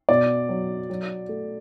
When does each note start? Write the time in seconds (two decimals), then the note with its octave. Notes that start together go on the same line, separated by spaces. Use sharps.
0.09 B2 D5
0.49 F#3
0.90 F#3
1.29 A3